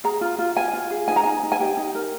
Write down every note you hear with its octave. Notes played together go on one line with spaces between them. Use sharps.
G#4 A#5
F4
F4
F4 G#5
F4
G#4
D#4 G#5
A#5
D#4 G#5
D#4
G#5
G4 G5
D#4
A#4